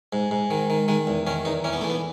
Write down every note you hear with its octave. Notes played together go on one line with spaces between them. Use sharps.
G#2
G#2
D#3
D#3
D#3 G#3
E2
D#3 C#4
E2 D#4
E3 C#4
B3
E3 A3
B3